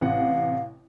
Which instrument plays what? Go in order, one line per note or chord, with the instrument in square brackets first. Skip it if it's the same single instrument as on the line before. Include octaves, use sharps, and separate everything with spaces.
[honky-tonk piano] A1 C3 F#5 [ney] F5